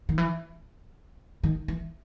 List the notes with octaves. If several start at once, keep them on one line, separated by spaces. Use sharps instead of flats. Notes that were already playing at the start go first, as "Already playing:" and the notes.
D#3
E3
D#3
E3